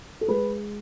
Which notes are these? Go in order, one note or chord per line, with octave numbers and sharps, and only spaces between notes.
A4
G#3 B4